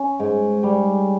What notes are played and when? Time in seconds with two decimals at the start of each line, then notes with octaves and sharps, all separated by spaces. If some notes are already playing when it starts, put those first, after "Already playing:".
Already playing: C#4
0.20 G#2
0.63 G3